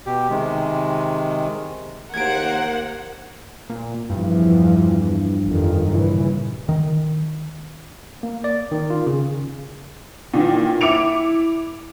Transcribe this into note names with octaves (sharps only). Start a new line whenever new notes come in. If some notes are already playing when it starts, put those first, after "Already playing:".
B2 G4
C3 D#3 G#3
D#2 A#3 A#4 C5 F#5 G#6 D7
A#2
E2 G2 E3 F3
G1 F2 D#3
A#2 C#3 E3
D#3
A#3
D5
D#3
F4
C#3
A#2 D#3 E3
E4 D6 C#7 D7 F7